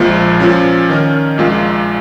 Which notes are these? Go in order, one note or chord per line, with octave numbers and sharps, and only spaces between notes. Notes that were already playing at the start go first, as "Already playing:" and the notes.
Already playing: A#1 A#2 F3 G#3
A#2 F3 C#4
D#3 C#4 A#4
A#1 A#2 G#3 F4